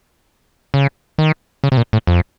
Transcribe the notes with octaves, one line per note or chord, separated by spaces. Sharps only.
C#3
D#3
C#3
C3
A#2
A2
F2